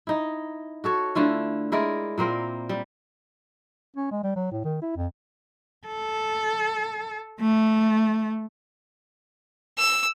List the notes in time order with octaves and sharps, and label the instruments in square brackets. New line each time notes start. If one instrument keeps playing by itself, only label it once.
[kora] D#4 E4
F#4 A4 C#5
D3 A3 E4 F4
G#3 E4 A#4 D5
A#2 A#3 C4 A#4
G3
[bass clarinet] C#4
G#3
G3
F#3
A2
D#3
E4
F2
[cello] A4
A3
[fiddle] E6